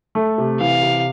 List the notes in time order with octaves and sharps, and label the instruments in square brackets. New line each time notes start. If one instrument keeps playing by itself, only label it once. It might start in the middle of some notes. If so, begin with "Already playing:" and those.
[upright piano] A3
C3
[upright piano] E3 [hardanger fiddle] F5
[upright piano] C3